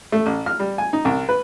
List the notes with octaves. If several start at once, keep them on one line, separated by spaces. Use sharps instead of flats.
A3
A1
F6
G3
G#5
D#4
C2
B4